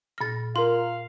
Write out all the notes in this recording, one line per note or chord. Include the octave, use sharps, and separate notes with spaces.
A#2 F6 A6 A#6
F4 A#4 F5 C6